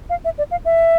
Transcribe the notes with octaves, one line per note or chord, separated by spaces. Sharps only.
F5
E5
D5
F5
E5